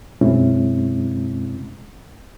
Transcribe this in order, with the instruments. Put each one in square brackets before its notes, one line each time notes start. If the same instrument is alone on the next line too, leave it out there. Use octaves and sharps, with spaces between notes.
[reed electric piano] F#2 B2 G#3 C4 C#4 E4